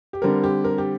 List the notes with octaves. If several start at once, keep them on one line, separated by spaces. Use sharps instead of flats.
G4
D3 G3 C4 A#4
G4
A#4
G4